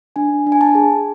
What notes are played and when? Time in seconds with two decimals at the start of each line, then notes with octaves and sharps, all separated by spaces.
0.16 D4 G#5
0.47 D4
0.52 G#5
0.61 A5
0.75 G#4